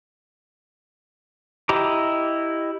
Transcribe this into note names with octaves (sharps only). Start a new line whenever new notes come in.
E4 G4 D#5 A#5 D6